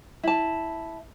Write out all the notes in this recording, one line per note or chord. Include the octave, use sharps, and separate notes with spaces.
E4 A5